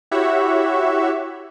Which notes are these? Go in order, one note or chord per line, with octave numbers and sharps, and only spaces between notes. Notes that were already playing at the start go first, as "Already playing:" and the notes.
E4 F#4 G4 C#5 E5 F#5